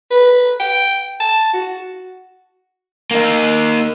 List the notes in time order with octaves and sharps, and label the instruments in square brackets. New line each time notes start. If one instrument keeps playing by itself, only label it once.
[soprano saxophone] B4
G5
A5
F#4
[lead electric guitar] A#3 D#4